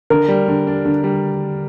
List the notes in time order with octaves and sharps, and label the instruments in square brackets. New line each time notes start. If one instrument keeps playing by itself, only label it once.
[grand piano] D3 [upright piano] A#4
[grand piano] G3
D3
D4
D3
G3